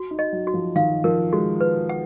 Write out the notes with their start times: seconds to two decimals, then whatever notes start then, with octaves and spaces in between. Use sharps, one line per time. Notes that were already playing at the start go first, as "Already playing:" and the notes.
Already playing: F#4
0.11 D#4
0.19 D#5
0.32 F#3
0.47 F#4
0.54 F3
0.75 D#3 F5
1.04 F3 A#4
1.32 G#3 F#4
1.61 B4
1.89 F#5